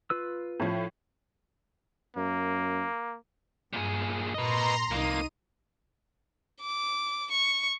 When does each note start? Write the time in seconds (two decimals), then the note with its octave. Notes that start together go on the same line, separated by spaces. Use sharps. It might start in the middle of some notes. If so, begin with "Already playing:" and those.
0.10 F4 B4 E6
0.60 A2 F3
2.17 F#2 A#3
3.73 G2 A#2 G#4
4.34 A#2 B4 D#5 A#5 C6
4.91 C2 F2 A#3 D#4 D#7
6.61 D6
7.31 C#6